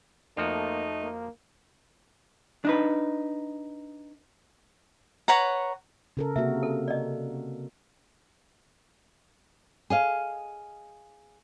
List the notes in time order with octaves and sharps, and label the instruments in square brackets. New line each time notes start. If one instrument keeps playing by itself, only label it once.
[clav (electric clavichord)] F2 F3 F#4 [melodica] A3 [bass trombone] A#3 [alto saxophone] D#4
[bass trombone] A#3
[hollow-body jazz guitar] D4 D#4 B4
[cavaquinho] B4 C#5 F#5 A#5
[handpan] C#3 A4 A#4
[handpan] C3 A#3 F#4 [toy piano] E5
[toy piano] A4
D5 D#5
[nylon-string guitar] G#4 D#5 F5